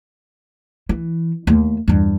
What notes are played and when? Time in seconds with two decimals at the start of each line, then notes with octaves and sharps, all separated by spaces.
0.89 E3
1.47 D#2 A3
1.88 E2 G2